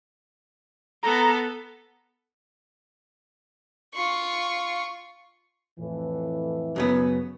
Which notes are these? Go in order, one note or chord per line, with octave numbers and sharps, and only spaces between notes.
B3 A4 A#5
F4 C#6
F2 A2 E3
F#2 C#3 B3